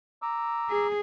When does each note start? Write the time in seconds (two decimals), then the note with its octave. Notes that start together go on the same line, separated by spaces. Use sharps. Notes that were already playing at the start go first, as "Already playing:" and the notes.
0.22 A#5 D6 E6
0.70 G#4